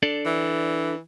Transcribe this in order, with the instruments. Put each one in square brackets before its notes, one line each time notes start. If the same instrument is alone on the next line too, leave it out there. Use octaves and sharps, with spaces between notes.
[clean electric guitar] D4 A4 D5
[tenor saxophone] E3